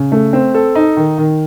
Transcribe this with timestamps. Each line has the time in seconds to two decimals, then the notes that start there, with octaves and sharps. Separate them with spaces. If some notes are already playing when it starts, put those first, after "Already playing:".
Already playing: C#3
0.12 A3
0.33 C4
0.54 A4
0.75 D#4
0.97 D#3
1.18 D#3